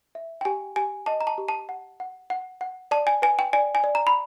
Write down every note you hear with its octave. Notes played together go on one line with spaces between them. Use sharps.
E5
G5
G4 G#5
G4 G#5
D#5 A5
A#5
A5
G4
A5
F#5
F#5
F#5
F#5
D5 A5
G#5
B4 G#5
G5
D5 G#5
G#5
D5
A#5
B5